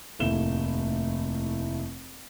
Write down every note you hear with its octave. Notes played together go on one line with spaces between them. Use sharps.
F1 D#2 A2 A3 E7 G7